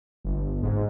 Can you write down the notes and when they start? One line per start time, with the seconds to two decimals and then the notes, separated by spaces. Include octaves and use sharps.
0.25 G1
0.63 G#2